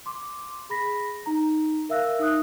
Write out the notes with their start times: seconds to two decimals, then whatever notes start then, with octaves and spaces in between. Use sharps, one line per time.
0.06 C6 D6
0.69 G#4 B5 A#6 B6
1.26 D#4 A#5
1.89 A#4 E5 F5 E6 F#6 A#6
2.19 D#4 D#6 F#6